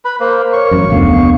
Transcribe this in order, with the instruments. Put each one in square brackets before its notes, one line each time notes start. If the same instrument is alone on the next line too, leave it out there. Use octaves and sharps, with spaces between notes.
[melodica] B4 B5
[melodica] A#3 [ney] A#4 [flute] C5
[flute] C#5 [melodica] C#6
[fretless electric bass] A1 F#2
[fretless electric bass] F1 D2 D3 [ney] B3 [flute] F5